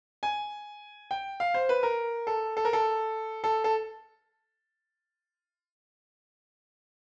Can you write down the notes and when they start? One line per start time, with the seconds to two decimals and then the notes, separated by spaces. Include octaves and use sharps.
0.23 G#5
1.11 G5
1.40 F5
1.54 C5
1.69 B4
1.83 A#4
2.27 A4
2.57 A4
2.65 A#4
2.73 A4
3.44 A4
3.64 A4